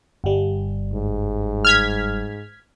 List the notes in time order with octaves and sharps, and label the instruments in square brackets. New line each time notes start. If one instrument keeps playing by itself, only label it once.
[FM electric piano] G1 G3
[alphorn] G#2
[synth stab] F6 G#6 B6